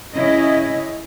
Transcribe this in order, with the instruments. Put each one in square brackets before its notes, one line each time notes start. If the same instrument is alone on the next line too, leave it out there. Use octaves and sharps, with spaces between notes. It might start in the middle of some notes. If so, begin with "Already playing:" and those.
[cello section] C#3 C#4 E4 D#5